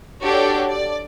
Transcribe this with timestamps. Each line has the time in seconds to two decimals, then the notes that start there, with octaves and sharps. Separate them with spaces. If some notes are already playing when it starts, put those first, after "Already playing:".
0.23 D4 F#4 G4 A4 C#5 D5
0.70 D5